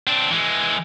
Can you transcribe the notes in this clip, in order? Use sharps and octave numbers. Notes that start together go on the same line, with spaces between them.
C4 D4
E3 G#3